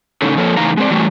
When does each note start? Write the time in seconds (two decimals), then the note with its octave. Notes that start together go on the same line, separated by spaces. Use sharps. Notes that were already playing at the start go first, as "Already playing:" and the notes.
0.22 A2 C#3 C#4 D#4 A4
0.37 F3 A#3 A4 C#5
0.57 A2 C#3 E3 D#4 F5 A#5
0.77 G#3 C4 D5
0.91 E3 F#3 G3 A3